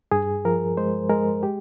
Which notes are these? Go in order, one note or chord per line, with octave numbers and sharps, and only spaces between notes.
G2 G#4
F3 A#4
G#3 C5
G#3 A#4
G4